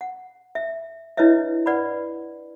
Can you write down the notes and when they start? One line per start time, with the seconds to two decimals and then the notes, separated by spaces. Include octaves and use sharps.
0.01 F#5
0.55 E5
1.17 D4 E4 B4 C#5 D#5 E5
1.66 B4 D5 F#5 B5